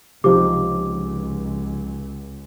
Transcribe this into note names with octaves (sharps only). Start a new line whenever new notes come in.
C#2 C3 F3 D#4 G4 D6